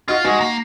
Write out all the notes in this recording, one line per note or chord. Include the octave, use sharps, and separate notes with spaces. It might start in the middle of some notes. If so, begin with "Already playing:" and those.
D#4 F4 F#4
G#3 D#4 F#4
A#3